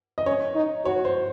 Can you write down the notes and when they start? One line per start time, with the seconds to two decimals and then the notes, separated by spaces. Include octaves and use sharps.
0.18 D#5
0.26 C#4 C#5
0.55 D#4
0.85 F#4 C#5
1.05 C5